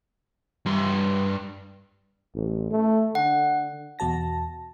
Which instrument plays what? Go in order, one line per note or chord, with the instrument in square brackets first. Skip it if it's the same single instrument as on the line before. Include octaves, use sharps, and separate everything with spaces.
[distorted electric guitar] G2 C6
[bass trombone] A1
A3
[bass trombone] D3 [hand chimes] F#5
[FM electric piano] E2 B2 F#4 A5 A#6